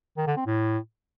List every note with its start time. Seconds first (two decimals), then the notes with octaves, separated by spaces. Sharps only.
0.17 D#3
0.27 D3
0.37 C4
0.46 A2